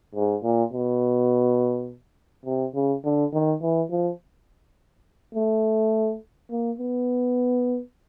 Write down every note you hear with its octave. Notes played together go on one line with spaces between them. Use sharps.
G#2
A#2
B2
C3
C#3
D3
D#3
E3
F3
A3
A#3
B3